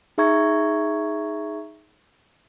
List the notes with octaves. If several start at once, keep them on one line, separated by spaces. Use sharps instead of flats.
D#4 G#4 E5 A#5 C#6 G#6